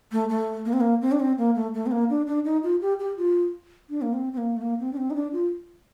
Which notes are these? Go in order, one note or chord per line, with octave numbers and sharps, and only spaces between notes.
A3
A3
A#3
C4
A#3
C4
D4
C4
A#3
A3
A3
C4
A#3
D4
D4
D#4
F4
G4
G4
F4
D4
A#3
C4
C4
A#3
A3
A#3
C4
D4
C4
D#4
D4
F4